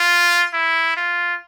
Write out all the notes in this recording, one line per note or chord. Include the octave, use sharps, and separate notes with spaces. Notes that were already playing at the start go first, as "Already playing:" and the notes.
Already playing: F4
E4
F4